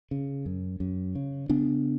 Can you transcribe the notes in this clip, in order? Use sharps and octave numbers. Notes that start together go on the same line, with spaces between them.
C#3
F#2
F#2
C#3
C#3 B3 D4